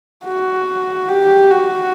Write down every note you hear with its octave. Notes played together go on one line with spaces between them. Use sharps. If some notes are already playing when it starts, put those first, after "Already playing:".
F#4
G4
F#4